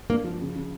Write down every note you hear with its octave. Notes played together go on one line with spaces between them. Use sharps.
A#3 D4
F3
C#3
C#3